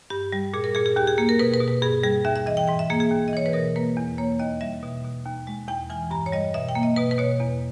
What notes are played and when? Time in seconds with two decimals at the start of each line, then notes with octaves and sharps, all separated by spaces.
0.10 G2 G4
0.33 G3
0.54 A#2 G#4
0.64 A#4
0.75 A#2 G#4
0.86 G#4
0.96 D#2 G4
1.07 G#4
1.18 A#3 G#4
1.29 A#4
1.39 B2 B4
1.54 B4
1.60 B2
1.68 B4
1.82 G2 G#4
2.03 G3 G#4
2.25 D#2 E5
2.36 E5
2.46 E3 D#5
2.57 G5
2.68 G#2 G5
2.79 E5
2.90 A#3 G#4
3.00 G#4
3.11 D#2
3.28 D#5
3.33 E3 C#5
3.46 B4
3.53 B2 A#4
3.76 A#3 B4
3.97 E2
4.18 A#3 C#5
4.40 D#2 D#5
4.61 G3 E5
4.83 B2
5.05 B2
5.25 D#2
5.47 G#3
5.68 E2 G5
5.90 E3 G#5
6.11 G2 A#5
6.26 C#5
6.32 G3 D#5
6.54 B2 E5
6.69 G5
6.75 A#3
6.83 D#5
6.96 B2 B4
7.11 B4
7.18 B2 C#5
7.40 E2